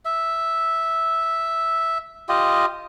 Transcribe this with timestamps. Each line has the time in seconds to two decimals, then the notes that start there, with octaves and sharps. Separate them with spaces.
0.05 E5
2.29 F4 G4 D#5